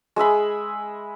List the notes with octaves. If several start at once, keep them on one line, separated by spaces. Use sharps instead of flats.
G#3 G#4 E5 B5